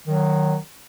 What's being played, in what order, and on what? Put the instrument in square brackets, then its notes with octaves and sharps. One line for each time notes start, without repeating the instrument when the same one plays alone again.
[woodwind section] D#3 F#3